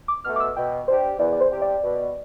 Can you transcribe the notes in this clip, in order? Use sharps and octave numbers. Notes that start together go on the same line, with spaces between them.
D6
B2 A3 F6
D6
E6
B2 G5
G3 D4 G4 C5
E2 D5
D5
C5
C3 G3 C4 G4
D5
B2